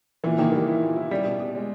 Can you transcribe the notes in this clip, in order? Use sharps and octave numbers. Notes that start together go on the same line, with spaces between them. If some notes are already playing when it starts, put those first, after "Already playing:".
A#2 E3
D#3 A#3
E3 G3
E4
A#2
E4
G3 C#4
B2
B2
G#3